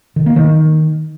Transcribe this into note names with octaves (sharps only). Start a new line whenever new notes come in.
D#3
A#3
D#3